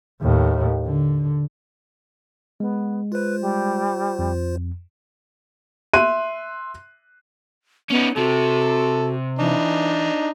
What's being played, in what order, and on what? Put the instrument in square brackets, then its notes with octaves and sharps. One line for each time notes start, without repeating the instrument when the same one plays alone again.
[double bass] D#2 A2
D3
[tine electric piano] G#3 [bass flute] B3
[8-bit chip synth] F4 C5 [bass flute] B4
[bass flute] G3
[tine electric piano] F2
[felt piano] E5 C6 F#6 D#7
[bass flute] B3 [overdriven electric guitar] C#4 D#4
[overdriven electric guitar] C3 [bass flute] F#4 [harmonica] A4
[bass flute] E3 [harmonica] D4 D#4